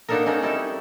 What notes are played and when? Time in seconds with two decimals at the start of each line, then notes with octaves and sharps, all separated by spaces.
0.09 A#3 B3 D4 D#4 A4 A#4
0.26 G#3 C4 C#4 D#4 A4 A#4
0.42 G3 D#4 E4 A4